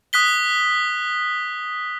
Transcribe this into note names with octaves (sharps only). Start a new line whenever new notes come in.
D#6 F#6 B6 G7